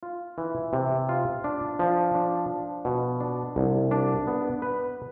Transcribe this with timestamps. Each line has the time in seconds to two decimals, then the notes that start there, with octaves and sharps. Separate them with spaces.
0.03 F4
0.38 E3
0.73 C3
1.09 F4
1.44 D4
1.79 F3
2.15 D4
2.50 F3
2.85 B2
3.20 D4
3.56 C2
3.91 D4
4.27 B3
4.62 B4